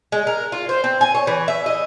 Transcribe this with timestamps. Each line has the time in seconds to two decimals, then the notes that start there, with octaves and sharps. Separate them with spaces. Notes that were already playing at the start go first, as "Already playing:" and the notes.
0.12 G#3
0.27 A#4
0.52 F4
0.69 C5
0.84 C4
1.01 G#5
1.15 C#5
1.27 E3
1.48 E5
1.66 D#5